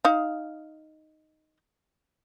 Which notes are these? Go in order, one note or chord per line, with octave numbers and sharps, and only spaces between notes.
D#4 F5